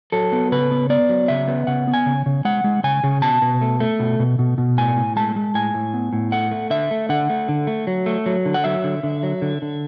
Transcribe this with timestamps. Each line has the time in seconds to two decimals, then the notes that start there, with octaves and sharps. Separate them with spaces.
0.12 F#3 A4
0.32 B3
0.52 C#3 B4
0.71 B3
0.90 B3 D5
1.09 F#3
1.28 C#3 E5
1.48 B3
1.67 C#3 F#5
1.87 B3
1.94 G#5
2.06 C#3
2.26 C#3
2.45 G#3 F#5
2.64 G#3
2.84 C#3 G#5
3.04 C#3
3.22 B2 A5
3.42 B2
3.61 A3
3.80 A3
3.99 B2
4.20 B2
4.39 B2
4.58 B2
4.78 A2 G#5
4.96 A2
5.16 G#3 A5
5.36 G#3
5.54 A2 G#5
5.74 A2
5.94 B3
6.13 A2
6.32 A3 F#5
6.51 A3
6.70 D3 E5
6.91 A3
7.09 D3 F#5
7.30 A3
7.49 D3
7.67 A3
7.87 F#3
8.06 A3
8.26 F#3
8.46 D3
8.54 F#5
8.64 F#3 E5
8.84 D3
9.03 D3
9.23 F#3
9.42 D3
9.62 D3